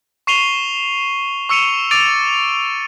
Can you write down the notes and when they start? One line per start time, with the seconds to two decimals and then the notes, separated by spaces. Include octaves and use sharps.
0.27 C#6 C7 D#7 F7 G7
1.49 C#6 E6 C#7 D#7 F7
1.91 D6 A6 D7 D#7 F7